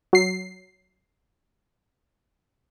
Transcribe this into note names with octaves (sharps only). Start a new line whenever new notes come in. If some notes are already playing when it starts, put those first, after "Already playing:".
F#3 C7